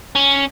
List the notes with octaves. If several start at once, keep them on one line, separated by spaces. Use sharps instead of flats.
C#4